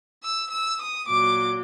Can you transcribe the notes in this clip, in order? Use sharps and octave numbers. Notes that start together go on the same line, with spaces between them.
E6
E6
D#6
A#2 F#3 D6